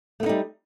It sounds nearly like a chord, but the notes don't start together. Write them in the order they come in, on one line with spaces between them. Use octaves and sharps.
A3 B3 D#4 G3